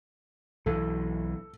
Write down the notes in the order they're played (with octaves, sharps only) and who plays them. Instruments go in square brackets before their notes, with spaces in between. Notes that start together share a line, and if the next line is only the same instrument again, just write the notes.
[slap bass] B1 E3 [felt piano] A4